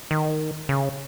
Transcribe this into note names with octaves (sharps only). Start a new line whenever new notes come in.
D#3
C#3